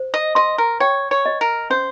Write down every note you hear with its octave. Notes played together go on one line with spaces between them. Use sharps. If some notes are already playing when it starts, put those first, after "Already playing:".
Already playing: C5
D#5
D#5 C6
A#4
C#5 G5
C#5
D#5
A#4
C#4 C5